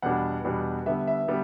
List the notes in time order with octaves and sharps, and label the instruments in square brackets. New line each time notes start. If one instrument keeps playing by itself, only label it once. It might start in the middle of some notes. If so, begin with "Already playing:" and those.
[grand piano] E2 B2 G3 B3 D4 [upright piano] F#5
[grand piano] E2 B2 G3 B3 D4
[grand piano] D3 G3 B3 [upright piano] E5
[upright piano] E5
[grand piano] D3 G3 B3